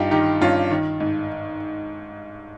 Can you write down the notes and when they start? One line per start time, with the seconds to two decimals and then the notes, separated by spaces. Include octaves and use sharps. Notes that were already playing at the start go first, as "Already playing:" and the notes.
Already playing: G2 D#4 F4 G4
0.11 D#3 D#4 G4
0.41 G2 C#4 F4
0.70 D#3
1.00 G#2